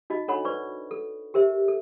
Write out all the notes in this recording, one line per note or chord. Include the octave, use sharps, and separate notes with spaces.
D#4 F#4 D#5
D4 A4 C#5 F#5 B5
B4 C5 D5 C#6
A4
G4 A#4 C5 E5
A4